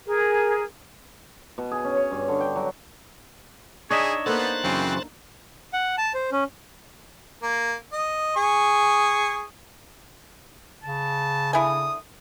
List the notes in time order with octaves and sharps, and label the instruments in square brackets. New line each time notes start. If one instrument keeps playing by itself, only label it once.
[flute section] G#4 A#4
[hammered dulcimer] B2
G#4
C#4
C#5
G2
D3
G5
F#3
[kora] D4 D#4 [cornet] G#4 [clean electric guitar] C#5 D#5 E5
[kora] A#3 A4 [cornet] B3 [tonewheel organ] C5 F#6 A6
[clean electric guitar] F#2 C#3 E3 [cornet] C4
[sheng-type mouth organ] F#5
A5
C5
C#4
[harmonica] A#3
D#5
G#4 C#6
[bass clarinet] C#3 [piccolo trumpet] A5
[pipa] D3 E4 G#5 [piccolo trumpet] D#6